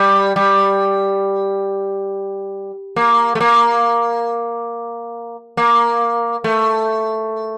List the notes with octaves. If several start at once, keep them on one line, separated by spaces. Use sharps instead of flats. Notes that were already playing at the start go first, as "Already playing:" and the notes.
Already playing: G3
G3
A#3
A3
A#3
A#3
A3